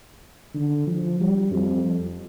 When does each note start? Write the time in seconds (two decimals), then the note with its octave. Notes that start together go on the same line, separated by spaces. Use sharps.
0.54 D3
0.87 F3
1.20 G3
1.53 F2